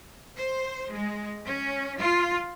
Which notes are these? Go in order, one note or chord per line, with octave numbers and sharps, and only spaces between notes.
C5
G#3
C#4
F4